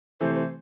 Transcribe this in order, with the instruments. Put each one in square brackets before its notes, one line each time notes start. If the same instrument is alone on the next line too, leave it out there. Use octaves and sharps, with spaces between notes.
[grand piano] C3 E3 A3 [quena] C5
[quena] C5